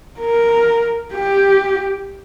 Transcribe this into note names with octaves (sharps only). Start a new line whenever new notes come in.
A#4
G4